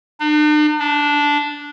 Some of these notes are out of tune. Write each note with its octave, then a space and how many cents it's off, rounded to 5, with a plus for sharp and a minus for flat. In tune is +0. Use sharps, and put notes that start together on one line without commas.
D4 +45
D4 -10